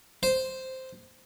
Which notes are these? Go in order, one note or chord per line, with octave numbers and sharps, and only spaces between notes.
C5